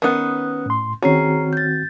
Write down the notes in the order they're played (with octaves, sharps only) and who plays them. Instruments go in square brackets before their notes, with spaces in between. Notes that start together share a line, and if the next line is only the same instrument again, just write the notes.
[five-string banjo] D#3 B3 [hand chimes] C#4 D#6 F#6
[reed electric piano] A2 C6
[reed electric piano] D#3 C4 F#4 [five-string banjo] C#4 [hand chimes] G#4 A#5 C7
[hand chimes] G6 A6